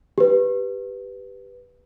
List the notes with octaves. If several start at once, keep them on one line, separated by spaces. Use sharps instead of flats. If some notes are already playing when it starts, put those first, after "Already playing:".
G4 B4